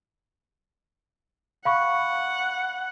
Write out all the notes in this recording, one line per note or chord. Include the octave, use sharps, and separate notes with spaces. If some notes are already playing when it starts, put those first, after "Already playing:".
F5 F#5 B5 C#6